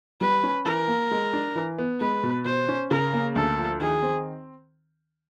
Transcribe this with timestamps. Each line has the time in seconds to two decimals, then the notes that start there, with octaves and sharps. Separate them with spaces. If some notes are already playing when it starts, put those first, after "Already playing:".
0.21 G3 B4
0.43 C#4
0.66 E3 A#4
0.88 A#3
1.11 G#3
1.33 D4
1.56 E3
1.78 B3
2.01 G#3 B4
2.23 B2
2.45 B2 C5
2.69 C#4
2.91 C#3 A#4
3.13 A#3
3.36 D2 A4
3.58 F3
3.80 D#3 G#4
4.03 C4